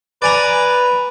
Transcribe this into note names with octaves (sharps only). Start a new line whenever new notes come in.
B4 D5 G#5 A#5